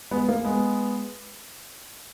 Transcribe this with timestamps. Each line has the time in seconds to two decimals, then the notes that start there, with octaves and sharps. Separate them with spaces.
0.11 G#3 B3
0.29 A#3
0.44 G#3 B3